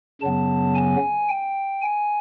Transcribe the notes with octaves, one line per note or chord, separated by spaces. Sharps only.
F#2 C#3 F#3 B3 A5
G#5
G5
G#5